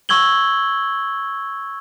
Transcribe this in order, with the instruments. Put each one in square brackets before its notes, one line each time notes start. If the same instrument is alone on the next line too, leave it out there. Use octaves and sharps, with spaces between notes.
[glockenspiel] C#6 E6 G#6 F#7 G7